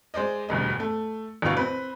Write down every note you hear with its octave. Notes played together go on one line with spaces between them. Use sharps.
G#3 C5 D5 D#5
E1 D2 G2 D#5
A3
A1 D2 B2 B3 F5 C#6
C4 B4